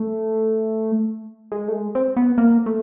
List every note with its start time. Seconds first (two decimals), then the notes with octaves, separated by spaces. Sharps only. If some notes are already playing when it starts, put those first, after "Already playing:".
Already playing: A3
1.52 G#3
1.68 A3
1.73 G#3
1.95 C4
2.16 B3
2.38 A#3
2.66 A3